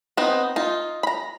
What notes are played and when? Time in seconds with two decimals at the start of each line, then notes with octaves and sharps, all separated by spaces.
0.17 B3 C4 D#4
0.56 D#4 F4
1.03 A#5 B5